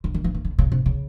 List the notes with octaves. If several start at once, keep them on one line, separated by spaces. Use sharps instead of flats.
D3
D#3
E3
D#3
D3
C#3
C3
C#3